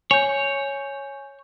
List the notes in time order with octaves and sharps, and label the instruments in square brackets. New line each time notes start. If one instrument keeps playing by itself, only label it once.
[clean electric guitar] C#5 [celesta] G#5 G6